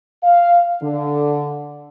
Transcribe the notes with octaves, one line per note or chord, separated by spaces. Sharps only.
F5
D3